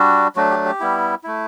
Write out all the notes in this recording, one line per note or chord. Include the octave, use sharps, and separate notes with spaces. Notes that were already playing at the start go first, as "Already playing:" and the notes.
Already playing: G3 D4 F#4
F#3 A3 D4 F#4
G4
G4
G3 B3 E4
A3 E4